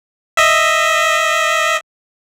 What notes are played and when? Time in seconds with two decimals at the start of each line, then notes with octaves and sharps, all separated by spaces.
0.37 D#5 E5